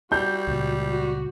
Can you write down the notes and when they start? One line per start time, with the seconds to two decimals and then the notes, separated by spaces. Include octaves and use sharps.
0.12 G3 F#4 G6
0.47 C#2 A#2
0.89 F#4